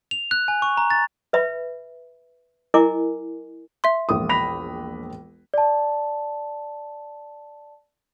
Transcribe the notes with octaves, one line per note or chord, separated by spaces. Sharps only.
F7
F#6
G#5
C#6
A#5
A6
B4 E5 B5
E4 A#4 D#5 G#5 D6
E5 C6
E1 A#1 D#6
B5 A#6 F7
D5 A5